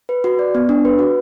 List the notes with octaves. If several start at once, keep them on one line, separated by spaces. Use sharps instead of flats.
B4
F#4
D5
B3
D4
B4
F#4